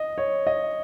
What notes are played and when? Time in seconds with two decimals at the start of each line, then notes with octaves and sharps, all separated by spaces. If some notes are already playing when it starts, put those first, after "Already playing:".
Already playing: D#5
0.18 C#5
0.47 D#5